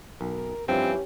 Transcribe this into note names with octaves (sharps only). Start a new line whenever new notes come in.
B1 A#4
G2 E3 F3 C4 C#4 G4